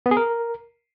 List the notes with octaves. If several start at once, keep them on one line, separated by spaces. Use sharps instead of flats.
B3
G#4
A#4